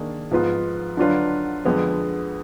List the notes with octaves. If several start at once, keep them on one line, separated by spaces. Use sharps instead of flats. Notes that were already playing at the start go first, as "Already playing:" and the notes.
Already playing: D#3 A#3 D4 G#4
G#2 F3 B3 F4 B4
D3 F#3 D4 F4 B4
F2 D3 G#3 B3